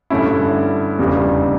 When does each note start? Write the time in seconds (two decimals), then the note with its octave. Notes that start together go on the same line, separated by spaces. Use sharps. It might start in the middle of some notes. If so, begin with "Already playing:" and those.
0.10 G2 D3 A3 C#4 E4
0.99 F1 E2 C#3 G3 D4